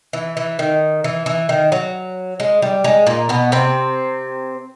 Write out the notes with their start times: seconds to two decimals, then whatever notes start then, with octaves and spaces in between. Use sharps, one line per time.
0.13 E3
0.37 E3
0.59 D#3
1.04 E3
1.26 E3
1.49 D#3
1.72 F#3
2.40 G#3
2.62 G3
2.84 G#3
3.07 A#2 A#3
3.29 B2 B3
3.52 C3 C4